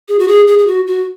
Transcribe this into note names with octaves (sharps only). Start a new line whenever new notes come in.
G#4
F#4
G#4
G#4
G#4
F#4
F#4